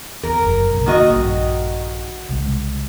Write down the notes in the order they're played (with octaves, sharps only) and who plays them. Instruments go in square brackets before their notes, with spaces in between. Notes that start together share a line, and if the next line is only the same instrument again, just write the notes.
[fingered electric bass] E2 [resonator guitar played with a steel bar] A#4
[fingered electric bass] F#1 F#2
B1 C#3
[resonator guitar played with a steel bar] D#3 F#4 D#5 [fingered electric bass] A#3
[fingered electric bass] A#1 G2
C2 C#3 G#3